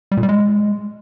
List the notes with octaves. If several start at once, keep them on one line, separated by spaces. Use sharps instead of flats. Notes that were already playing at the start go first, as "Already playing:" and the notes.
G3
A#2
G3
G#3